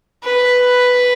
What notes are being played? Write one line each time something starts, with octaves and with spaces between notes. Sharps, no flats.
B4